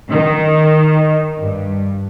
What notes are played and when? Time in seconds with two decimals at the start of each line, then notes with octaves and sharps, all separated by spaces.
0.10 D#3
1.41 G2